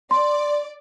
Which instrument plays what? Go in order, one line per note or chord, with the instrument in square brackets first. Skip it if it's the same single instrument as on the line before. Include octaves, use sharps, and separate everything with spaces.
[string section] D5 [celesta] C6